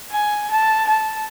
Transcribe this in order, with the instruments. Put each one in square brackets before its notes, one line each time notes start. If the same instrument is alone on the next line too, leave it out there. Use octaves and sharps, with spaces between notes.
[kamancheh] G#5
A5
A5